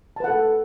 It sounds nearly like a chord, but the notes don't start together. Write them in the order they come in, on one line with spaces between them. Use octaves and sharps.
A5 B4 F#5 A4